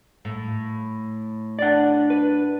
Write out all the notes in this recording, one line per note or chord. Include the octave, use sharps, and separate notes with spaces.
A2
D4 D5 F#5
B4